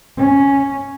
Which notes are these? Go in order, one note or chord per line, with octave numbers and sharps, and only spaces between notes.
C#4